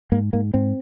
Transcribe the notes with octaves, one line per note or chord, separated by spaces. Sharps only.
G#2 A#3
G#2 A#3
G#2 C4